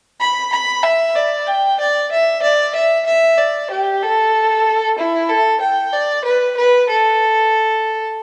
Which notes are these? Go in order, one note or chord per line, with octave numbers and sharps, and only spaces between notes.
B5
B5
E5
D5
G5
D5
E5
D5
E5
E5
D5
G4
A4
E4
A4
G5
D5
B4
B4
A4